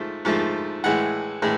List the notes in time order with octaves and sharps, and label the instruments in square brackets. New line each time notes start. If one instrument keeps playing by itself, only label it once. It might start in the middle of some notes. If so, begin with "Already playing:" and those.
Already playing: [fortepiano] G#2 F3 A3
G#2 F3 A3
A2 E3 G#3 F#5
A2 E3 G#3